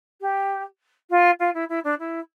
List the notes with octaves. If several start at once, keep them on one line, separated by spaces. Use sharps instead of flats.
G4
F4
F4
E4
E4
D4
E4